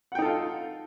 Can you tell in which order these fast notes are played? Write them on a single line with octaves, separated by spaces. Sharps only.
F#5 G5 D#4 A4 F4